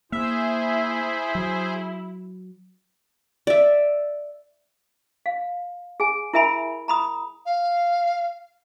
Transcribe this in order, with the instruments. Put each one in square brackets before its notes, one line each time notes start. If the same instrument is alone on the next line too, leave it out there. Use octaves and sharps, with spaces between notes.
[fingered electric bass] A#3 [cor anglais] E4 [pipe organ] G#4 C5 [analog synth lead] E5
[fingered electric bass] F#3
[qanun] D5 E5
[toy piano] F5
G#4 G#5
E4 A#4 E5 G#5 B5
A#5 B5 D#6
[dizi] F5